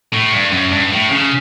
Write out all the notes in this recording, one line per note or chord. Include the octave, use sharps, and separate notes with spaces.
A2
G2
F#2
G2
A2
C#3